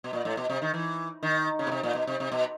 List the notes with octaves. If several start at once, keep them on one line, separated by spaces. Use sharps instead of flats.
B2
A#2
A2
B2
C3
D#3
E3
D#3
C#3
B2
C3
A#2
B2
C3
C3
B2